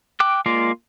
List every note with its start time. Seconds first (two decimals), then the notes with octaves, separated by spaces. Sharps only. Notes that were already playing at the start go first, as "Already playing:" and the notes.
0.20 G5 D6 F#6
0.46 G#3 A#3 F4 D5